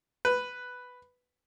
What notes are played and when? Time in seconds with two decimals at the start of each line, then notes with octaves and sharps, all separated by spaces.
0.25 B4